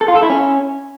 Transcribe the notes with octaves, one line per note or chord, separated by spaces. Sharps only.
A4
F4
A4
E4
C#4